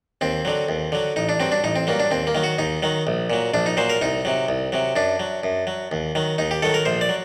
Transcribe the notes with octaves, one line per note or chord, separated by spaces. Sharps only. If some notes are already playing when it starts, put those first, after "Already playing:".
D#2 C4
D3 F#3
D#2
D3 F#3
A1 D#4
D4
G2 F#3 C4
D4
A1 D#4
C4
G2 F#3 A#3
D4
D#2 C4
A#3
D#3 F#3
F#4
D#2 D#4
D#3 F#3
A#1
A#2 F#3
A#1 D4
D#4
A#2 F#3 C5
A#4
C2 D#4
C3 F#3
C2
C3 F#3
F#2 D4
F#3
F#2
F#3
D#2
D#3 F#3
D#2 D#4
G4
D#3 F#3 A4
A#4
A#1 C5
D5
F#3